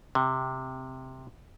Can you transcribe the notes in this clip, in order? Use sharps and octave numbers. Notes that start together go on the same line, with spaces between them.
C3